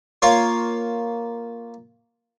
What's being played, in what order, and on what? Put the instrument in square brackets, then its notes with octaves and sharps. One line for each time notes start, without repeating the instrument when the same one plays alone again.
[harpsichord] A#3 F4 C#5